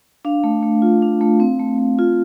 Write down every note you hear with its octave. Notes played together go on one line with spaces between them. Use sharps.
D4 F5
A3
A3
F4
D4
A3
C4
A3
A3
F4